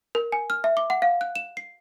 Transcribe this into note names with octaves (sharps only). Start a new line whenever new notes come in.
A#4
G#5
F6
E5
D6
F#5
F5
F#6
E7
C7